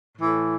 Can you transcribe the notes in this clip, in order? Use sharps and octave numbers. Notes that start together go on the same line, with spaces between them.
A2 E3